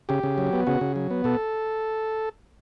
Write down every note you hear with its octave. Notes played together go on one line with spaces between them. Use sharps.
C#3 G4
C#3
F#3
B3
C#3 F#4
C#3
F#3
B3
B2 A4